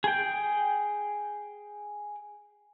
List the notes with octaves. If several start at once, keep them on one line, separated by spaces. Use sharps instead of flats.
G#4 G5